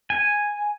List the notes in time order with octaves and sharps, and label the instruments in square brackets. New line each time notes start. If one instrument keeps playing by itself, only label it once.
[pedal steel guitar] G#5